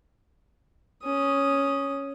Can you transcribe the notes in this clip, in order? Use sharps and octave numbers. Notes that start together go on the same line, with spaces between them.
C#4 D#6